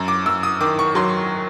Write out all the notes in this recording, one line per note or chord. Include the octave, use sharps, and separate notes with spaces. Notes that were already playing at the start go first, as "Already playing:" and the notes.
Already playing: F#2
D6
F#2 E6
D#6
D#3 D6
C#6
F#3 C6